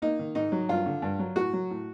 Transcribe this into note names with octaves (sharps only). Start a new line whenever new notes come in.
A#3 D#4
D#3
G#2 D#4
F#3
G2 F4
D3
G2
F#3
A2 F#4
F#3
A2